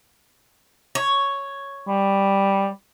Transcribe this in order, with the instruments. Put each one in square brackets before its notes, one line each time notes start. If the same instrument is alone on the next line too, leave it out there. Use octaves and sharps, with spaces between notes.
[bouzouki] C#5
[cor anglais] G3